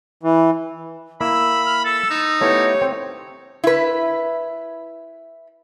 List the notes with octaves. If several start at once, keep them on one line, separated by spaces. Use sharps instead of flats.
E3
A#3 E4 B5 E6
F6
A4 E6
D#4
A3 B3 E4 G4 C#5
C4
E4 B4